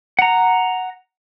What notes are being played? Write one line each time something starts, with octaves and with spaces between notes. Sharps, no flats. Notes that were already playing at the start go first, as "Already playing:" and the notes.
F#5 A#5